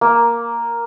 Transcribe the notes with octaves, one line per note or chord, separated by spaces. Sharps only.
A#3